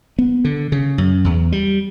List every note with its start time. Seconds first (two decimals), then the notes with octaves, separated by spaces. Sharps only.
0.19 B3
0.45 D3
0.72 C#3
0.98 F#2
1.24 E2
1.52 G3